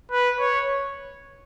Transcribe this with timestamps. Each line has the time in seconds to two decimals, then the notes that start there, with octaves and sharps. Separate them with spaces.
0.11 B4
0.40 C#5